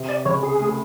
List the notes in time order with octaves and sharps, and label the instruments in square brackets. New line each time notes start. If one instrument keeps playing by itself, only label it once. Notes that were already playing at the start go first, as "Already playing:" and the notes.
Already playing: [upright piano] C3
[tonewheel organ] D5
[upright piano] C#2 [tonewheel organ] C#5
[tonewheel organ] G#4
[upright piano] A3